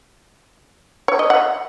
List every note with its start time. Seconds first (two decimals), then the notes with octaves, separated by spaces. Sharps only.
1.08 C#5
1.19 D#5
1.30 F#5